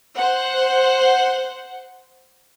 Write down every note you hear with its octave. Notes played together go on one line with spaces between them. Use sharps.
C5 F#5